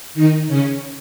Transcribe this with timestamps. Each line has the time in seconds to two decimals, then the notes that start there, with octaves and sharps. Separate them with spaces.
0.14 D#3 D#4
0.48 C#3 C#4